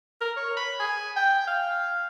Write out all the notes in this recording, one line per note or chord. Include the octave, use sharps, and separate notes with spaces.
A#4
C#5
B5
G#5
G5
F5